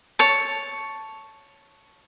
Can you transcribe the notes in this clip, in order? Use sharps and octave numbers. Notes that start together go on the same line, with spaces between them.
C#5 A5